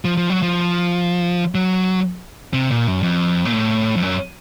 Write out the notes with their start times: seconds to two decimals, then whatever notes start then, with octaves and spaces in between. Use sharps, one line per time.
0.05 F3
0.17 F3
0.30 F#3
0.42 F3
1.55 F#3
2.53 C3
2.71 A#2
2.87 F#2
3.03 F2
3.45 A#2
3.53 A2
3.96 F2
4.02 F#2